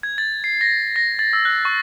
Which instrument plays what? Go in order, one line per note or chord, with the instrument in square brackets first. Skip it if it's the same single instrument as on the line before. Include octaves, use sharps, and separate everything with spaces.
[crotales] G#6
A6
C7
A#6
A#6
A6
E6
F#6
C#6